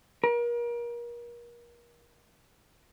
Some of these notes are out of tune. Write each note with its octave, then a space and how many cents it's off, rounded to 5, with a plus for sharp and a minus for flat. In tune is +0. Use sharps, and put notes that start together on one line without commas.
A#4 +35